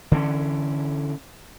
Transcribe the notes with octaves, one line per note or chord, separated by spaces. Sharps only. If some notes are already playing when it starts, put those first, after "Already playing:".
D3 E3 C4 C#4